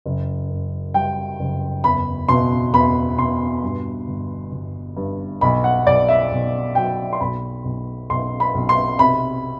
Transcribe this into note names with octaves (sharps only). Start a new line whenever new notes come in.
F#1
F#2
G3 G5
F#1
E2 B5
B2 C6
E2 B5
B2 C6
G2
G1
G1
G2
B1 B5
F#5
B1 D5
E5
B1
F#3 G5
C6
B1 B5
B1
B1 C6
B5
B1
C6
C3 B5